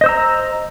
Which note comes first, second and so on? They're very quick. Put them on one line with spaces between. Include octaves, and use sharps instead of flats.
D#5 C5 E6 A#5